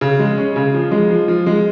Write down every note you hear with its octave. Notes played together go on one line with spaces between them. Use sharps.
C#3
G#3
C#4
C#3
F3
G#3
F3
F3
G#3